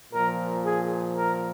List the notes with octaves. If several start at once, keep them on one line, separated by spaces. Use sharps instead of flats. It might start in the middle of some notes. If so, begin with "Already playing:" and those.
A#2 F3 A#4
G#4
A#4